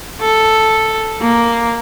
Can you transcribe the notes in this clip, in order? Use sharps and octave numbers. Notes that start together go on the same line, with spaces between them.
A4
A#3